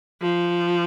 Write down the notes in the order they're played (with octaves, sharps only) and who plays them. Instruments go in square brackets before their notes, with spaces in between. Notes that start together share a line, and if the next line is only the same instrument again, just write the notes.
[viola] F3